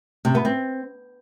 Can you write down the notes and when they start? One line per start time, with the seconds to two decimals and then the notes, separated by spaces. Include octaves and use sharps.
0.25 C3
0.35 B3
0.45 C4